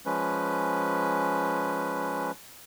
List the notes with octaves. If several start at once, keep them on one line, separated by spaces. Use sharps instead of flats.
F3 G#3 C#4 B4